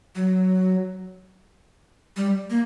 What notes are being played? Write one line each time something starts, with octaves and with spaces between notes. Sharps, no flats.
F#3
G3
A#3